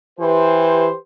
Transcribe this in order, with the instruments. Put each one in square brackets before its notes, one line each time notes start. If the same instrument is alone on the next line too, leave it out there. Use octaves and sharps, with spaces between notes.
[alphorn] E3 [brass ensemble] G4 B4 C5